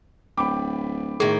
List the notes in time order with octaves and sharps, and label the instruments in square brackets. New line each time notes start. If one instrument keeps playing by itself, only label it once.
[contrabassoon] D1 [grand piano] G5 B5 D6
[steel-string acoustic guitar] A2 D#3 [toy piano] G#4